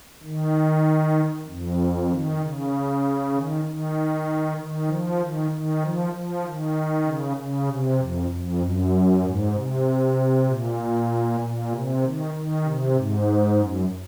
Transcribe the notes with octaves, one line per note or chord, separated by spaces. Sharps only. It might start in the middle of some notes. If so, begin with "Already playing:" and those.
D#3
F2
D#3
C#3
D#3
D#3
D#3
F3
D#3
D#3
F3
F3
D#3
C#3
C#3
C3
F2
F2
F#2
G#2
C3
A#2
A#2
C3
D#3
D#3
C3
G#2
F#2